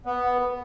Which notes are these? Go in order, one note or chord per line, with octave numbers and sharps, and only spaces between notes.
B3